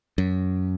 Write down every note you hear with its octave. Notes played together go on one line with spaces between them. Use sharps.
F#2